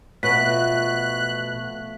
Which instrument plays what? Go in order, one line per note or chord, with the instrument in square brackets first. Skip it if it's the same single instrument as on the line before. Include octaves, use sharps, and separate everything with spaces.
[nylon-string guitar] B2 [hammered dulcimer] F3 A3 F#4 [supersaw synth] F#6 [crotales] B6